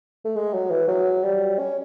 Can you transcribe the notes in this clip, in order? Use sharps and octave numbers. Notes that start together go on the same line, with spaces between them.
A3
G#3
F#3
E3
F#3
G3
C#4